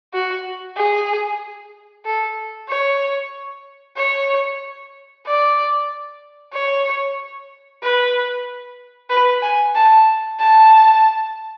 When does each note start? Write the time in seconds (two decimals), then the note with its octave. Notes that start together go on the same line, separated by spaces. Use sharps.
0.13 F#4
0.76 G#4
2.05 A4
2.69 C#5
3.97 C#5
5.26 D5
6.53 C#5
7.83 B4
9.10 B4
9.42 G#5
9.75 A5
10.39 A5